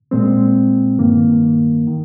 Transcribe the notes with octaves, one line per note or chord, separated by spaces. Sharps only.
A#2 G#3 C4
G2 D#3 A#3
D#3